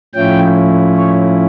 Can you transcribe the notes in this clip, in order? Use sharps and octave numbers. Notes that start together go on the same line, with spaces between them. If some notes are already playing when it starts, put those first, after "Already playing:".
A2 F3 C#4 E4 G5
C#5